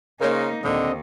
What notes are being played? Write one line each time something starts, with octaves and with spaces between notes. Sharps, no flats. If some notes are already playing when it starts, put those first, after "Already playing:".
C#3 A#3 D#4 A#4 C5 C#5
D#2 A#2 D3 C4 D#5